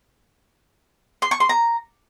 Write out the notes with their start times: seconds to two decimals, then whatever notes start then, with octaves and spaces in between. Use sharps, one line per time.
1.22 C6
1.31 C#6
1.40 C6
1.49 A#5